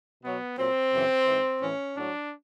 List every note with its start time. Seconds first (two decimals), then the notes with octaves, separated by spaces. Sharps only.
0.22 B2 F#3 B3
0.57 A#2 F#3 C4
0.92 F#2 C#3 E3
1.26 G#2 E3
1.61 A2 E3 C#4
1.95 A2 F#3 D4